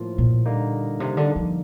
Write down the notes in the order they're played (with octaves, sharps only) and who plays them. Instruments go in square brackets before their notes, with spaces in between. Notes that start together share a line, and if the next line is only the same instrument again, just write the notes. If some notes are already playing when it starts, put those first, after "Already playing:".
Already playing: [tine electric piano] A2 F3 A#3 F4
[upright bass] A#2
[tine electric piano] D3 G3 A#3 D#4
[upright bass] C3
D3
F3